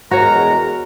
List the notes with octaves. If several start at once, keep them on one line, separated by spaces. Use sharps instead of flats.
E2 G#3 F#4 A#4 C#5 A#5